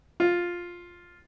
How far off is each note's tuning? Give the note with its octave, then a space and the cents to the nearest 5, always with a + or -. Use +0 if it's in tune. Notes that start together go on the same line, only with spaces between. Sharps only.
F4 +5